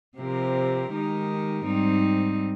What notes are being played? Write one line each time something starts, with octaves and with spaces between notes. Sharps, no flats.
C3 F3 C4 G4 A#4
D#3 G#3 D#4 G4 A#4
G#2 G3 C4 D#4